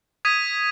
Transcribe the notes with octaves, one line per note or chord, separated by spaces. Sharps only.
D#6 G#6 B6 D#7